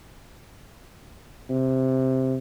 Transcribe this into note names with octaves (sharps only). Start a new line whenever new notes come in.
C3